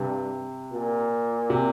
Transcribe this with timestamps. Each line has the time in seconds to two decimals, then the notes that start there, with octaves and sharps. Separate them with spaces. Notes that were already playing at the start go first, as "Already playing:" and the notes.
Already playing: G2 C3
0.73 A#2
1.50 C3